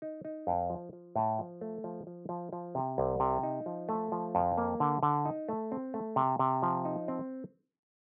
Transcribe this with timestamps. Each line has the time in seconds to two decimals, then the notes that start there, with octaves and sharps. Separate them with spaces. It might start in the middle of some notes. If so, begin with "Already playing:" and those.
0.02 D#4
0.25 D#4
0.47 F2
0.70 F3
0.93 F3
1.16 A2
1.39 F3
1.61 A3
1.84 F3
2.07 F3
2.29 F3
2.53 F3
2.75 C3
2.98 C2
3.20 C3
3.43 D#4
3.66 F3
3.89 A3
4.12 F3
4.35 F2
4.58 A#3
4.80 D3
5.03 D3
5.25 D#4
5.49 A3
5.72 C4
5.94 A3
6.16 C3
6.39 C3
6.63 F3
6.85 D#4
7.08 C4